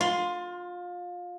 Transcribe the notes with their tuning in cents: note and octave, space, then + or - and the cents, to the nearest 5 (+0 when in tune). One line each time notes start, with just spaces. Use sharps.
F4 +25 C6 +0